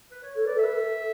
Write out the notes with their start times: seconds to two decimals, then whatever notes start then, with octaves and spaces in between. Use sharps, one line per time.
0.11 B4
0.23 C#5
0.35 A4 C#5
0.45 B4 D5
0.54 A4 E5
0.64 B4
0.74 A4